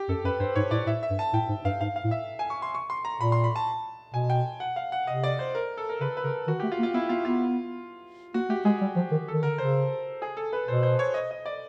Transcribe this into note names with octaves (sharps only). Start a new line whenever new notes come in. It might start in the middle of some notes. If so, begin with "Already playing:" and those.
Already playing: G4
F#2 A4
F#2 B4
G2 C5
G#2 C#5
A2 D5
A2 E5
E5
G2
A5
A2 G5
G#2
G2 F5
G#2 F5
F5
A2
E5
G#5
C#6
C6
C#6
C6
A#5
A#2 B5
C6
B5
A5
B2 G#5
G5
F#5
F5
F#5
C3 D#5
D5
C5
A#4
A4
A#4
C#3 B4
B4
C#3 A#4
D#3 F#4
A3 G4
F4
A#3
F4
B3 E4
B3 F4
B3 F4
A#3 F#4
A3 G4
G#3 G#4
G3
F3
D#3
D#3 A4
D3 A#4
C#3 C5
G#4
A4
B4
B2 C5
C5
C#5
D#5
D#5
D5